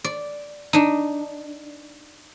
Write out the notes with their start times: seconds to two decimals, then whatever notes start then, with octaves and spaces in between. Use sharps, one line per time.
0.04 D5
0.73 D4 D#4